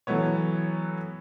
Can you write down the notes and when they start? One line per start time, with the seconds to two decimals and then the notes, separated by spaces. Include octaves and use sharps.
0.07 E3 F#3 A3 B3 C#5